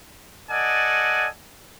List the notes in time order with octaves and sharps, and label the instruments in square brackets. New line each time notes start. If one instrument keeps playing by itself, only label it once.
[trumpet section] A4 D5 D#5 F#5 G#5